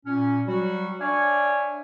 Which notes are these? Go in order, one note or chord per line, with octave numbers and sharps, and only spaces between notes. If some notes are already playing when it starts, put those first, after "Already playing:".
A#2 C#4
F#3 G3 F#4
D4 C#5 D5 E5 F5 G#5